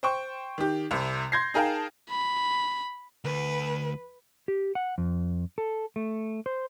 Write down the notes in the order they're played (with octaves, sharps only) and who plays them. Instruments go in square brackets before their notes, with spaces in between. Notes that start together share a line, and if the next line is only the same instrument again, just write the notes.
[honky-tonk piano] C5 G5 C#6
D#3 G4
C2 C3
C6 G6 G#6 A#6 C7
D#4 G#4 A#4 F5 G5 A5
[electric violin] B5
[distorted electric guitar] D2 [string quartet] B4
[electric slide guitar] G4
F#5
F2
A4
A3
C5